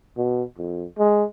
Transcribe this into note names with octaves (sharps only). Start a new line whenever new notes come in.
B2
F2
G#3